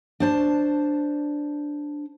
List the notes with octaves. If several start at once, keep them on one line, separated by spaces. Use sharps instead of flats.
D4 C5 A5